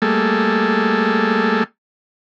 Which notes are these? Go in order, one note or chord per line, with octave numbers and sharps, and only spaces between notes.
G3 A3 A#3 G#4 A4